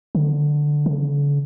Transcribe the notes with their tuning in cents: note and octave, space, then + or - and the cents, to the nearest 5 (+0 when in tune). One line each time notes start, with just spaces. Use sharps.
D3 +5
D3 -45